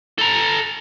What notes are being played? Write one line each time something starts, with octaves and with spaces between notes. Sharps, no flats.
A4 A#5